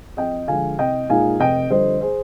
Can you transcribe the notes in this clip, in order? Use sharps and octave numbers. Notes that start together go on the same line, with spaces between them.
F2 D#5 G5
D3 F3 G#3 F5 G#5
C2 D#5 G5
A#2 G#3 D#4 F5 G#5
F1 D#5 G5
F2 D3 G3 C4 C5 D#5
G#4 C5